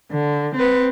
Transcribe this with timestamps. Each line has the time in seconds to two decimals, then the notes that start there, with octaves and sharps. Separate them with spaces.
0.13 D3
0.56 C4 B4